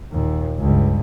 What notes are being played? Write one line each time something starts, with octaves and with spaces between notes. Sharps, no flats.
D#2 A#2
C#2 G2